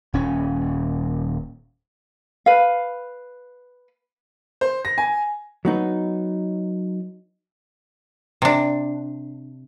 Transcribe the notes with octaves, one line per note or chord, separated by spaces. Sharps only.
D#1 C#4
B4 F5
C5
A#6
G#5
F#3 B3 D#4
C3 D4